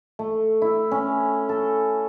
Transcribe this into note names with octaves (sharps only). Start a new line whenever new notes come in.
A3
E4
C#4
A4